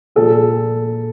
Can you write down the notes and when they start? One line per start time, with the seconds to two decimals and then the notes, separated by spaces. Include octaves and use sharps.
0.16 A#2 A4